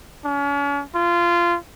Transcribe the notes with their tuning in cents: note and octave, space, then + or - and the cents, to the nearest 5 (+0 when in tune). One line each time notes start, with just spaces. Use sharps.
C#4 +40
F4 -20